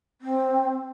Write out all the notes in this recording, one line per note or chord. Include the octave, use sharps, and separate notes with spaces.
C4